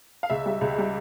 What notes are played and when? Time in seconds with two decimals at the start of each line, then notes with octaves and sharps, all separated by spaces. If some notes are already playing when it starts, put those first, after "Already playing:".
0.23 F5
0.30 C#2 E5
0.46 G3
0.61 C#2
0.78 G3